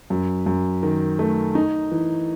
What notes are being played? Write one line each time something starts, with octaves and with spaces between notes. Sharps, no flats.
F#2
F#2
D#3
A3
D#4
E3